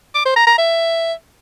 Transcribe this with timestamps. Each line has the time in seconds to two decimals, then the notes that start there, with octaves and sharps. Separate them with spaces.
0.15 D6
0.26 C5
0.36 A#5
0.47 A#5
0.58 E5